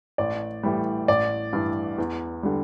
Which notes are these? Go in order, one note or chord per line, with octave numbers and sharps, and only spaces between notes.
A1 D5
A2 E3 G3
A1 D5
G2 E3
E2
D3 G3